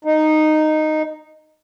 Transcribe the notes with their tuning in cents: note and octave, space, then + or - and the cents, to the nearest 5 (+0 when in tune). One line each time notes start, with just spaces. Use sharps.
D#4 -10